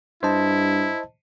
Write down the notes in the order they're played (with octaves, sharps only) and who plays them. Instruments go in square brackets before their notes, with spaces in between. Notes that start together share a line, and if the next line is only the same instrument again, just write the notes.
[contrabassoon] G2 [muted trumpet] E4 [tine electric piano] C5 D#5 A5